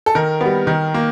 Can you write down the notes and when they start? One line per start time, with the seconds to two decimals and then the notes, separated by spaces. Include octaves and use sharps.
0.06 A4
0.15 D#3 A#4
0.41 G3 B3
0.67 D#3
0.94 A#3